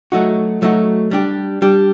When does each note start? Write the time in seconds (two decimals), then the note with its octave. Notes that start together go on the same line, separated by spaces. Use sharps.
0.12 F#3 A3 D#4 F#4
0.62 F#3 A3 D#4 F#4
1.11 G3 D4 G4
1.62 G3 D4 G4